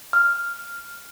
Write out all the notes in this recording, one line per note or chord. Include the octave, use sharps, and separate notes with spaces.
F6